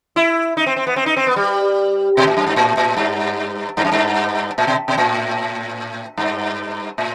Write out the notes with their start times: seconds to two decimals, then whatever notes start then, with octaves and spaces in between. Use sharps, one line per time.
0.16 E4
0.57 D#4
0.66 C4
0.76 C4
0.87 B3
0.96 C4
1.06 D#4
1.17 C4
1.27 B3
1.36 G3
2.17 B2
2.27 A2
2.37 F#2
2.47 G2
2.56 A2
2.77 A2
2.97 G2
3.77 G2
3.85 F#2
3.92 G2
4.58 A2
4.67 B2
4.88 B2
4.98 A2
6.18 G2
6.98 A2